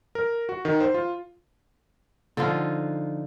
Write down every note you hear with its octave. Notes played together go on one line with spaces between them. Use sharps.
A#4
F#4
D#3
C5
F4
D3 F3 D#4 F4